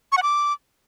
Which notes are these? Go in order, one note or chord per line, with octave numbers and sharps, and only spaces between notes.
C#6
F#5
D6